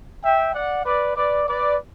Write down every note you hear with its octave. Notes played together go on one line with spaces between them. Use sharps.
E5 G5
D5 F#5
B4 D5
B4 D5
B4 D5